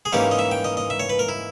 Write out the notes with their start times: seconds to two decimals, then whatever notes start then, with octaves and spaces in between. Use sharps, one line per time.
0.05 G#4
0.13 G#2 E3 A#3 C#4 G4
0.31 D#5
0.39 E5
0.51 G5
0.64 D#5
0.77 D#5
0.90 E5
1.00 C#5
1.10 B4
1.19 A#4
1.28 E4